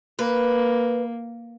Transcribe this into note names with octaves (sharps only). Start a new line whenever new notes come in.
A#3 B4